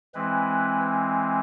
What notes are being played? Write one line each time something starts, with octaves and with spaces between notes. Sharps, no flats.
E3 G#3 C4 B4